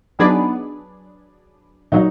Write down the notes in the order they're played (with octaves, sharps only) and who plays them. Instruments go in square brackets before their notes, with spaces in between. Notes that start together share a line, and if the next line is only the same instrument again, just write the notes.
[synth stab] F#3 D4 G#4 B4 D5 [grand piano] B3 D#4
[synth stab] A#2 F#3 [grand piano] D#4 F#4